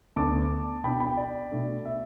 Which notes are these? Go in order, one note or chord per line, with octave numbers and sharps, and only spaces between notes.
D2 D3 B3 A5 D6
B2 B3 D4 G5 B5
G5 B5
D5
B2 A3 D4
E5